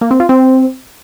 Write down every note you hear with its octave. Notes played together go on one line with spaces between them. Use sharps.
A#3
C4
F4
C4